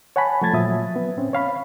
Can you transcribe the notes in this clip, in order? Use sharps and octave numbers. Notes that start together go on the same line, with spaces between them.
C#5 F#5 G#5 A5 B5
F3 A3 A5 G#6 A6
A#2 F3 F#3 E5 D#6
B3
A2 C4 C#4
C#5 F5 B5